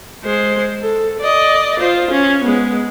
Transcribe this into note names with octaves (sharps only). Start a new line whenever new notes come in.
G#3 C5
A4
D5 D#5
F4 C5
C#4
G#3 B3